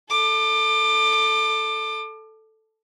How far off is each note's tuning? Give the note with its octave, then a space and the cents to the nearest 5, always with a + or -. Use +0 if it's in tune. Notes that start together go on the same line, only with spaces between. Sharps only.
A4 +0 D6 +30